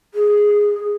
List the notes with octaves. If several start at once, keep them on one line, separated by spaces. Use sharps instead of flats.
G#4